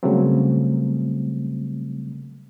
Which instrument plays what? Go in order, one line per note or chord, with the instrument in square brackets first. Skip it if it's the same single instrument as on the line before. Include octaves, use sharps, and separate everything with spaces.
[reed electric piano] C#3 F#3 G3 A3 A#3 C4